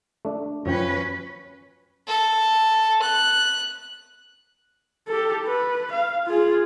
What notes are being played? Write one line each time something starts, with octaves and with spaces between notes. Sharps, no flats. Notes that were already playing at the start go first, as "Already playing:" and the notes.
A3 D4
F#2 F3 C#4 B4 G5
A4
F#6
G4 A4
B4
F5
F4 G#4